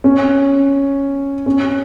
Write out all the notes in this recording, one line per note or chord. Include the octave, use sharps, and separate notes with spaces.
C#4
C#4